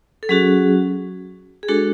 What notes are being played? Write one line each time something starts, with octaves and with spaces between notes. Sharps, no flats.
A4
F#3 C#4 F#4 G#4
G#4
G#3 D4 F#4 A4